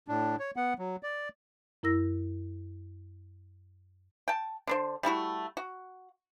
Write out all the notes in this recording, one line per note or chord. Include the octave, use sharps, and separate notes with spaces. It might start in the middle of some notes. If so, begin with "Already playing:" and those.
A2 D4
C#5
B3 F#5
F#3
D5
F#2 E4 A#4 E6 A#6
G5 A5
D3 D4 C5
G3 A3 E4 F#4
F#4